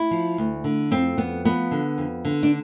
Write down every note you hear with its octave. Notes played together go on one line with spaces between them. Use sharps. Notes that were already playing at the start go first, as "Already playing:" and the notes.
Already playing: E4
F3
D2
D3
F2 C4
F2 B3
F3 B3
D3
F2
D3
D4